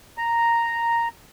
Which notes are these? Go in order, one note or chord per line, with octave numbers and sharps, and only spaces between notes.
A#5